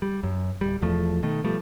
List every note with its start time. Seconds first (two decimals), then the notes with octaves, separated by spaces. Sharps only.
0.02 G3
0.23 F#2
0.61 D1 G3
0.81 E1 E2 F3 A3
1.23 B2 D#3 A3
1.44 B2 F3 G3 A3